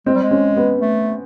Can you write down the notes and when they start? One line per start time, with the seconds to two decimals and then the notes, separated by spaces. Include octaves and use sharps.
0.06 G#3 C4
0.15 G3
0.23 G#3
0.31 C#4
0.57 B3
0.81 A3